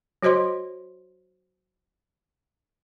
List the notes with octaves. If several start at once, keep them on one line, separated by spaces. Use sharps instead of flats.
F#3 F#4 C5 D#5 C6